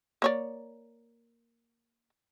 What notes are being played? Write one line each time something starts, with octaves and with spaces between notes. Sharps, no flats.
A#3 C#5 D5